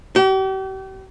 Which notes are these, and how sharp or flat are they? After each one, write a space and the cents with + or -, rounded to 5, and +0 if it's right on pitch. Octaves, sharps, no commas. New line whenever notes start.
G4 -40